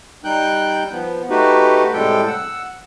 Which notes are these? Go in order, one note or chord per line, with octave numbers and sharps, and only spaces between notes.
G3 D#4 G5 F#6 G6
F3 B3
A3 D#4 F#4 G4 B4
A2 C3 G3 G#3 A4 G5
F#5 E6